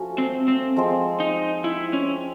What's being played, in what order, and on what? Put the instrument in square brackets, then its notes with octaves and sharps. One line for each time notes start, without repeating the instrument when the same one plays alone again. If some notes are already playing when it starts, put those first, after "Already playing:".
Already playing: [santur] F3 A3 C#4 F#4
[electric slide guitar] C4
C4
[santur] F3 G#3 C4
[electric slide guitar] D#4
E4
C#4